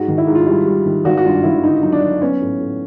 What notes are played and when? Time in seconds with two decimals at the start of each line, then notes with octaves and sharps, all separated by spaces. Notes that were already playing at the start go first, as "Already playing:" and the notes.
Already playing: G#2 F#4
0.08 D#3
0.18 E4
0.27 G#2
0.35 F4
0.46 G3 E4
0.66 G3
0.86 D#3
1.05 G#1 F#4
1.17 F#4
1.25 G2 F4
1.43 G#1 E4
1.63 D3 D#4
1.83 F#3 D#4
1.92 D4
2.02 F#3
2.22 B3 C#4
2.41 A2
2.60 A2